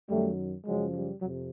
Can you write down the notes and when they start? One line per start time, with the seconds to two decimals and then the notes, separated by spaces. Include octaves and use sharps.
0.10 F#2 D#3 F#3 G3 A3
0.66 F#2 C#3 F3 F#3 G#3
0.94 G3
1.22 F2 C3 F#3